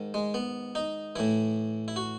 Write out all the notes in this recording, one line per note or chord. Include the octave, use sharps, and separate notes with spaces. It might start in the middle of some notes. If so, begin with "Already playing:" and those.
Already playing: G#2 D#3
G#3
B3
D#4
A2 E3 E4
E4
F#4